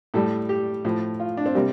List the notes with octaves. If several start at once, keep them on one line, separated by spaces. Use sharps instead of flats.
A2 G3 A4
G4
A2 F3
F4
D4
C4
C3 G3 A#3